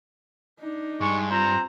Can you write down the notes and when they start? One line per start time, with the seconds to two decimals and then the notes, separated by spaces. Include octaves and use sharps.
0.59 D4 D#4
1.01 G2 G#3 C#6
1.31 C4 F4 A#5